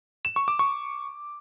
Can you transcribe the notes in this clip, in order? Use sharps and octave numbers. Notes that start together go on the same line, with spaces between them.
E7
C#6
D6
C#6